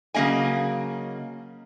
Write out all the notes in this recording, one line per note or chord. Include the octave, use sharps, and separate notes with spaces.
C#3 F#3 A#3 D#5 G#5